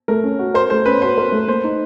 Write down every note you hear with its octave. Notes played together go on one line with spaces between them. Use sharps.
A3 A#4
C#4
F#4
A#4 C5
A3 C5
C#4 B4
F#4 C5
A#4
A3
A#3 C5
D#4